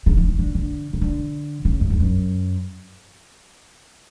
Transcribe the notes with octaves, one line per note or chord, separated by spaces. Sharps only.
C#3
E3
E3
D3
D3
C#3
D3
C#3
F#2
E2
F#2